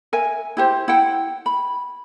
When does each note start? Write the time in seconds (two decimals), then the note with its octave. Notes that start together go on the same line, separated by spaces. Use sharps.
0.13 A#4 E5 G#5
0.57 E4 G4 C5
0.88 E4 F#5 G5
1.46 B5